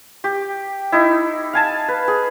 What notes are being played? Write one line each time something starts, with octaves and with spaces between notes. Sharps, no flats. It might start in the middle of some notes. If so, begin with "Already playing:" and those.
G4
D#4 E4
F5 G#5 A5
B4
G#4